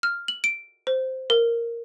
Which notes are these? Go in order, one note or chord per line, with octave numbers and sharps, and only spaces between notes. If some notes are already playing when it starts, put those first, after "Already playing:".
F6
F#7
D7
C5
A#4